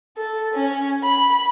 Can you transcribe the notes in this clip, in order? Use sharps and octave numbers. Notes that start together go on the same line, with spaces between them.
A4
C#4
B5